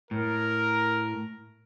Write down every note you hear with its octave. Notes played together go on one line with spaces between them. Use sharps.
A2 A#4